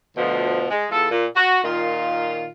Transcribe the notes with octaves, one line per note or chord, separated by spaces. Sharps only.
D2 B2 F3
G#3
E2 F4 A4
A#2
F#4
A#2 D#3 F4